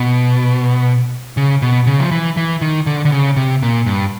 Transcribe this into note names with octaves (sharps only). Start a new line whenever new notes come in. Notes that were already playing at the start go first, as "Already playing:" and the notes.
Already playing: B2
C#3
B2
C#3
F3
E3
E3
D#3
D3
D3
C#3
C3
A#2
G2